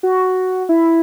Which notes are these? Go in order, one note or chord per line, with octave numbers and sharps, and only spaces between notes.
F#4
E4